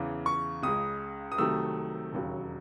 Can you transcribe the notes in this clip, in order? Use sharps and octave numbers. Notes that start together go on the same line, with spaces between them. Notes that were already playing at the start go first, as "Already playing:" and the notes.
Already playing: E2 C#3 E3
C#6
C#2 C#3 G#3 D#6
D#6
C2 C3 D#3 F#3 A3 E6
E1 D#2 C#3 F#3